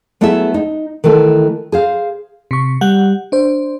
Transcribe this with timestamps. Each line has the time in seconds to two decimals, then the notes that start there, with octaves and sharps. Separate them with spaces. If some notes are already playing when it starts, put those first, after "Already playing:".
0.21 F#3 A3 B3 E4 G#4 E5
0.54 D#4
1.04 D#3 E3 A3 E4
1.72 G#4 C5 F5
2.51 C3 C#6
2.81 G3 F#5
3.32 D4 C5